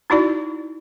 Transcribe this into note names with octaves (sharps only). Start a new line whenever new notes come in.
D#4 E4 F#4 D5